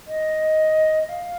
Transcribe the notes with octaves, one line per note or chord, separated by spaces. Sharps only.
D#5
D#5
F5